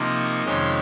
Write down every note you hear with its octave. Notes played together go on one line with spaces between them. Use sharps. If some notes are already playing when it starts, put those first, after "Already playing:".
Already playing: C3 F3 A#3 D#4
C#6
F2 C3 D#3 G#3 C#4 C6